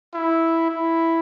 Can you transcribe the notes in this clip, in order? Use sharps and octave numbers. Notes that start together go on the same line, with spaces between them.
E4
E4